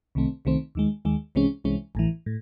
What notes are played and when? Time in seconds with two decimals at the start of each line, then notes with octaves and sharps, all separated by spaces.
0.15 C2 C3 D#3 A3 C4
0.45 C2 C3 D#3 A3 C4
0.75 D#2 D#3 G#3
1.05 D#2 D#3 G#3
1.35 C2 C3 E3 G#3 C#4
1.64 C2 C3 E3 G#3 C#4
1.95 A1 A2 E3
2.26 A2